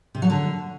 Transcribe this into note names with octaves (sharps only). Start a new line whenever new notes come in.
C3
F#3
D3